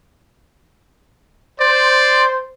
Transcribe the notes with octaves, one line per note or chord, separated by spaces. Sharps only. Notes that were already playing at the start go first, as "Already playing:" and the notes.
C5 D5